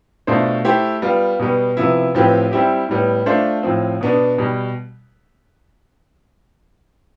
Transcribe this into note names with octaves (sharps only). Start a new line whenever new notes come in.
B2 A3 D4 F4 C5
A3 E4 G4 C5
G3 B3 F4
B2 G3 B3
C3 F3 B3 E4
A2 F3 C4 G4 B4
G3 C4 E4 G4
A2 G3 B3
A3 D4 F4 C5
A2 F3 C4
B2 B3 D4
B2 G3